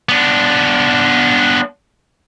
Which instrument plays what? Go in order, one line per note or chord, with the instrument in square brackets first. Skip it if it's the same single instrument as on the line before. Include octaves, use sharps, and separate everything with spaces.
[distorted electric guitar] B3 D4